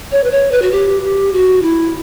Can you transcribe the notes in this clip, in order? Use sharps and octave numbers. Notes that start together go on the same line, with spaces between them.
C#5
B4
C#5
B4
F#4
G4
G4
F#4
E4